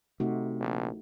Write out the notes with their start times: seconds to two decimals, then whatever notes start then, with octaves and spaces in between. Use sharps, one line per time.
0.20 C3 A3 D#4 F#4
0.60 A#1